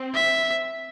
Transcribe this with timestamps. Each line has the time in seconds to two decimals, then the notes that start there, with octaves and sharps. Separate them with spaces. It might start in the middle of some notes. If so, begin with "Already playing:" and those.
Already playing: C4
0.14 E5